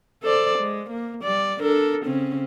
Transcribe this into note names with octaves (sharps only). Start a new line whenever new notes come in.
A4 C5 D5
G#3
A#3
G3 D5
D4 A4 A#4
C#3 C4 C#4